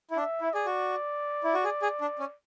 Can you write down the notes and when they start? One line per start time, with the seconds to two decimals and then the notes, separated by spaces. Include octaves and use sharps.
0.11 E4
0.17 D4 E5
0.41 E4
0.54 G#4 D5
0.66 F#4
1.44 E4
1.54 F#4
1.64 G#4
1.82 G#4
2.01 D4
2.19 C#4